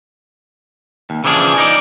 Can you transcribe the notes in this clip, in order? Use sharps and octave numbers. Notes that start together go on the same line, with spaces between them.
D#2
C#3 E3 F3 D4 G#4
D#4 D5